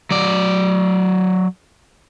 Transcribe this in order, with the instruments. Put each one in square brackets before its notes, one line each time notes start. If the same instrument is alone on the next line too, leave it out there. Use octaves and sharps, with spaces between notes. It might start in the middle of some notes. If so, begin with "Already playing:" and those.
[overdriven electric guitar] F#3 D5